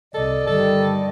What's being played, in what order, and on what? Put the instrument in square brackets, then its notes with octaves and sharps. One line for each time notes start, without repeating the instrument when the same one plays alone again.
[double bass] C2 [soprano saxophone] A4 [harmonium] D5 D#5
[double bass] G1 D#3 [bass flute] G3 [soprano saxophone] A4